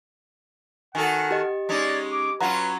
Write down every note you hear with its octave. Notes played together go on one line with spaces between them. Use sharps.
D#3 F#4 A4 F#5 G#5
G4 D#5
G#3 C#4 D#4 D5
D6
F#3 C#4 F4 B4 F#5 A#5